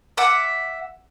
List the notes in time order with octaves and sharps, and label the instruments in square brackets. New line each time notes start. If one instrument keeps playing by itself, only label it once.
[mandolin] E5 F#5 D6